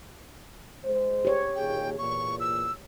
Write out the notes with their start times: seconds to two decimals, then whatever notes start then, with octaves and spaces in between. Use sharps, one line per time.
0.85 G#3 C5
1.25 G4 C#5
1.56 D#2 A#2 G#4 G5
1.98 E2 A#2 C#6
2.40 E6